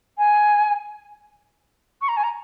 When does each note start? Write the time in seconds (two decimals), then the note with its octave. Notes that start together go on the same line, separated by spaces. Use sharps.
0.18 G#5
2.01 C#6
2.08 A#5
2.16 G#5
2.23 A#5